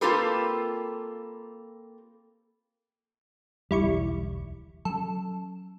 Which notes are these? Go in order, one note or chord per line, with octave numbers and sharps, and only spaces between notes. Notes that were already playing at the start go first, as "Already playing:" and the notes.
A#3 C4 F4 G4 A4 B4
D1 B1 E2 G3 E4 C#6
F#3 C#4 A4